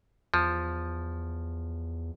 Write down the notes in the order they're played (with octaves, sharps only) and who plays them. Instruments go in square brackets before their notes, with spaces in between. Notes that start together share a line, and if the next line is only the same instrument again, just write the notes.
[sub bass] E2 [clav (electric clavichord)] F3